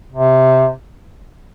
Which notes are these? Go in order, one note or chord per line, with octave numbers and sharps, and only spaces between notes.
C3